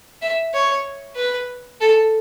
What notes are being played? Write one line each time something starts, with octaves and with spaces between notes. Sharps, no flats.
E5
C#5
B4
A4